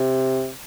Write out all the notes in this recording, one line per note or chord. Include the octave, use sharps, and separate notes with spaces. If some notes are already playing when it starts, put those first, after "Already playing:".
Already playing: C3